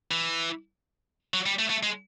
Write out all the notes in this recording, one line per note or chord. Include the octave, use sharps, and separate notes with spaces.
E3
F#3
G3
A3
A3
G#3